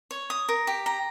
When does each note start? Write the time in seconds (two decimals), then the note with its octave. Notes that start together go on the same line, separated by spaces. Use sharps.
0.11 C#5
0.30 D#6
0.49 A#4
0.67 G4
0.86 A#5